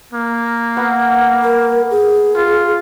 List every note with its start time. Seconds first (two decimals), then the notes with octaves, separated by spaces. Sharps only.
0.13 A#3
0.77 B3 F#5
1.43 A#4
1.91 G#4
2.36 F4